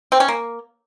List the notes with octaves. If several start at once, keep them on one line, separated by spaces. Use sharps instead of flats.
C4
C#4
A#3